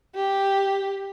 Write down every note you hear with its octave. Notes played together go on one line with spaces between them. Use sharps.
G4